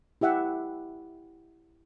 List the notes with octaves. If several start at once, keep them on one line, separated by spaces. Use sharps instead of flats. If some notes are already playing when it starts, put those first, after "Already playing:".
E4 G4 E5 F#5